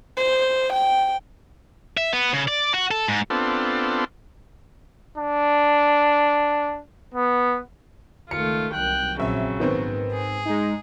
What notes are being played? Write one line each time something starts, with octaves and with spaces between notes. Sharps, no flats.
C5
G5
E5
B3
C#3
D5
F#4
A4
G#2
B3 C4 D4 F4 A4
D4
B3
C#2 D#3 A3 F4 C#7
C2 D#3 F#3 G5 F#6
A#1 C#3 F#3 C4 E5
G#2 D#3 B3 C4
G#4
G#3 D#4